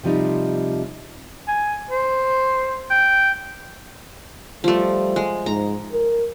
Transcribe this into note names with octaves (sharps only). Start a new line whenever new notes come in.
C3 F3 G3 D#4
G#5
C5
G5
F3 G3 A3
G#3
G#2 A#5
A#4